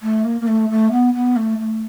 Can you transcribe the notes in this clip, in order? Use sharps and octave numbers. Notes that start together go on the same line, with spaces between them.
A3
A#3
A#3
A3
A3
B3
B3
A3
A3